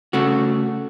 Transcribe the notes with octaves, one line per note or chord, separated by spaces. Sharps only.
C#3 A3 F#4